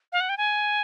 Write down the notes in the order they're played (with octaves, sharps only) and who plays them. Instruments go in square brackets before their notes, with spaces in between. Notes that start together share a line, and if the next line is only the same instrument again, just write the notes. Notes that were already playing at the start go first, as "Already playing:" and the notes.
[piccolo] F5
F#5
G5
G#5